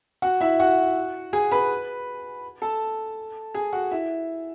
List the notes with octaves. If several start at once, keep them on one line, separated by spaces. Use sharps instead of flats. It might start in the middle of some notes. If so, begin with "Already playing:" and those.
F#4 F#5
E4 E5
F#4 F#5
G#4 G#5
B4 B5
A4 A5
G#4 G#5
F#4 F#5
E4 E5